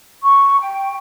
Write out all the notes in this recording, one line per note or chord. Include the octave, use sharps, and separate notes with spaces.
C#6
G5